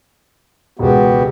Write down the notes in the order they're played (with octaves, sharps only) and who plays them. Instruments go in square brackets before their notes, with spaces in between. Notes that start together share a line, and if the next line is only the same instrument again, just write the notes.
[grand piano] E1 C#2 [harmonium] B3 F#4 G4